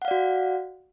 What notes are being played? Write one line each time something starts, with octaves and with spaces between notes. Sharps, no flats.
F#4 D5 F5 F#5